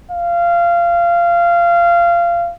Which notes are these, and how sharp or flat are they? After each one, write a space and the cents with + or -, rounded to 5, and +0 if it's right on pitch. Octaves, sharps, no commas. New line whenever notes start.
F5 -20